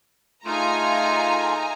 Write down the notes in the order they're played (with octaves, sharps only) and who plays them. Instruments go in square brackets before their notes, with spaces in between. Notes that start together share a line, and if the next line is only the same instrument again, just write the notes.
[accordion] A3 F4 [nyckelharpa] D#4 G#4 [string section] G#5 A#5